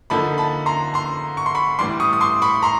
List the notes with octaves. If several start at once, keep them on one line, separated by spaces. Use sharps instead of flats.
D3 F3 A#3 D#4 A5 B5
A5 B5
A#5 C6
A#5 C6
C#6
C6
B5 C#6
A2 E3 G3 C6 D6
C#6 D#6
D#6
C6 D6
B5 C#6
A#5 C6